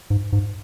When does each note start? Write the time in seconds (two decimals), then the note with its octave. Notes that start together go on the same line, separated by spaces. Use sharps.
0.10 G#2
0.33 G#2